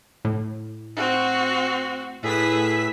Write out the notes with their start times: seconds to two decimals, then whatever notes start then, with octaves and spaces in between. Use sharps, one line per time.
0.25 A2
0.96 C4 F#4
2.23 A2 G#4 B4 E6 B6